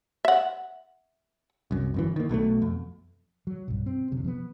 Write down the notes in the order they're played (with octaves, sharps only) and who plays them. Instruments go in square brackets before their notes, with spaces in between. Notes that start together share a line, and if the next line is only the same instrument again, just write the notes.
[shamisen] E5 F#5
[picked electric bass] C2 F#2
G1 F#2 E3
D#3 A#3
B1 B2 G3 A3
F2
[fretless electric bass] F#3
B1 G2
C4
F#1 B1 F#2 C3
F3 A3 B3